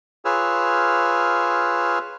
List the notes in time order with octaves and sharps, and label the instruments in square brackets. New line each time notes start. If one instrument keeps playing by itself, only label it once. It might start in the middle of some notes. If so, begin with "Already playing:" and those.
[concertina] F4 G#4 B4 C#5 E6 F6